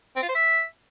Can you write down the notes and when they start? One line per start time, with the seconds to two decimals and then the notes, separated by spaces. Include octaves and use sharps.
0.16 C4
0.22 F4
0.29 C5
0.35 E5